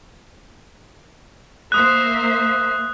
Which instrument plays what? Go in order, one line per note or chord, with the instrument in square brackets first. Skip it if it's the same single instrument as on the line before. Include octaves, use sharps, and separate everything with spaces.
[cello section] A#3 C5 E5 [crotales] D#6 F#6